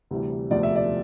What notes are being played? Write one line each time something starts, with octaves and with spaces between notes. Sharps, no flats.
D2 C3 E3 G3
E1 D2 C3 F3 A3 D5
E5
D5